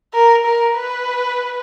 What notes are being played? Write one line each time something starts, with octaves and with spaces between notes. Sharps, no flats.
A#4
A#4
B4